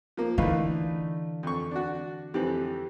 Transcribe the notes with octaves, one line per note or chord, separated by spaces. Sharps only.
F3 A#3
D3 E3 A3 D#4 B4 F5
F2 C#6
D4 F#4
F2 E3 C4 G4 F#6